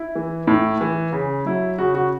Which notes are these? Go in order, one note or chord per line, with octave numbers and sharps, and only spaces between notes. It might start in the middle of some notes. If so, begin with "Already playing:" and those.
Already playing: E4
E3
A2
E3
C#3
F#3 E4
C#3 F#4
F#4